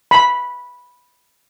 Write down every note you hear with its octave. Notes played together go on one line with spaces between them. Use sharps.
B5